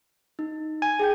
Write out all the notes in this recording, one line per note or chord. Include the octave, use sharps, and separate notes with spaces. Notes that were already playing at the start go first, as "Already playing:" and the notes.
D#4
G#5
G#4 G5 G6